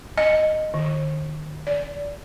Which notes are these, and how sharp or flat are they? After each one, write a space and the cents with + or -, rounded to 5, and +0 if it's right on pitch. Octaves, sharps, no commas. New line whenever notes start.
D#5 -5
D#3 -35
D5 -30